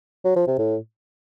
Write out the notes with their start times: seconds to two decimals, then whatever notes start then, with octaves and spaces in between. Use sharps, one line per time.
0.25 F#3
0.36 F3
0.47 C3
0.59 A2